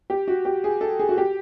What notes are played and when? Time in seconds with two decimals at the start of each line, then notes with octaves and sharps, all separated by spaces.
0.10 G4
0.28 F#4
0.45 G4
0.64 G#4
0.81 A4
0.99 G#4
1.09 F#4
1.18 G4